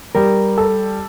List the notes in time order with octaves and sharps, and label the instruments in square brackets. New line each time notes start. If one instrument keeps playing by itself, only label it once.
[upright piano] G3 [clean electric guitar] A#4
[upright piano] A4